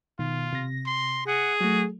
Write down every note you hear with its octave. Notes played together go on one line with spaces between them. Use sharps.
B2 D#3 F4
C3 A#6
C6
G#4 F#5
F#3 A3 F#4